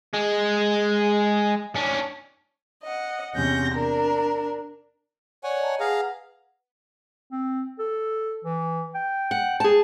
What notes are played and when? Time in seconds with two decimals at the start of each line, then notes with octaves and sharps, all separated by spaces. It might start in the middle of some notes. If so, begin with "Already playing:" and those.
0.13 G#3
1.75 C#4 D4
2.83 D#5 F#5
3.34 E2 C3 C#4 G6 A#6
3.72 D4 A#4
5.43 C#5 D5 F#5 G#5
5.60 D#5 A5 A#5
5.80 G#4 B4 F5 F#5 A#5
7.31 C4
7.79 A4
8.44 E3
8.95 G5
9.31 F#5
9.60 G#4 A5